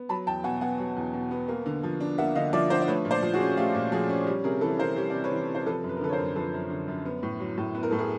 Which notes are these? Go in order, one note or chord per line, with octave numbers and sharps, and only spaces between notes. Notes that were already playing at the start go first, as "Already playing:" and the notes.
Already playing: B3
F#3 A5 B5
E2 G5 A5
B2 F#5 G#5
B3 F#5 G#5
F#3
E2
B2
B3
A#3
D3
F3
D4
A#3 E5 F#5
D3 D#5 F5
F3 D5 E5
D4 C5 D5
D5
A3 B4 C#5
A#2
C5 D5
F3
F#4 G#4
C#4
A3 F4 G4
A#2
F3 F#4 G#4
C#4
G3
C3 G#4 A#4
E3 A4 B4
C3 A#4 C5
G3 C#5
C3 D5
B4 C#5
E3
C3
C5
F3 A4 B4
F#2
B4
A#4
D3 A4 B4
C#5
A#4 C5
F#2
F3 A4 B4
F#2
D3
F#2
B3
A2
F#3
A2
B3 B4
A#4
A2 A4
G#4 A#4